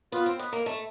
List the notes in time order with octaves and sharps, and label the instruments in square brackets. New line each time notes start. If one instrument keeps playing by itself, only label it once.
[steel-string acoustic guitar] B3 [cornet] F4
[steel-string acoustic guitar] C4
B3
A#3
A3